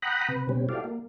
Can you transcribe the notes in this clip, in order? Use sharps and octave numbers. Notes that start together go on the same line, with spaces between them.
F#5 G5 A#5 B5 D#6 F#6
C3 B4
B2 G3 C4 C#4
E4 F#4 G4 A4 D5 F5
A#3